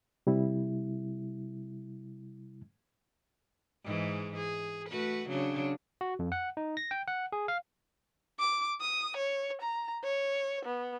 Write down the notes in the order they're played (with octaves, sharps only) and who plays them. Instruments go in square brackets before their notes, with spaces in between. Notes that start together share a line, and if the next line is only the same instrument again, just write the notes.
[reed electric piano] C3 G3 E4
[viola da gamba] G#2 E3 G#3
G#4
A3 F#4 B4
C#3 F#3 D4
[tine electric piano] F#4
F2
F#5
D#4
A#6
G5
F#5
G#4
F5
[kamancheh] D6
D#6
C#5
A#5
C#5
B3